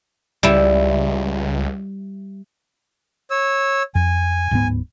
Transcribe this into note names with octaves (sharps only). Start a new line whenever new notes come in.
C#2 G3 E4
C#5 E6
F2 G#5
D1 G#2 B3